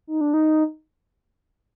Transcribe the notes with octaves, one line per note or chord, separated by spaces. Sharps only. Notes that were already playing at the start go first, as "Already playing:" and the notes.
D#4
D4
D#4